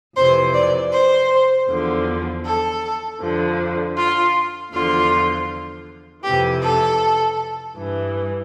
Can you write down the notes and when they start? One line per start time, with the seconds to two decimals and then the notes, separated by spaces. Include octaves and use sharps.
0.15 F2 C3 E3 C5
0.54 D5
0.91 C5
1.69 E2 D3 F3
2.44 A4
3.21 F2 D3 F3
3.97 F4
4.72 E2 D3 F3 F4
6.23 F2 C3 E3 G4
6.62 A4
7.76 G2 E3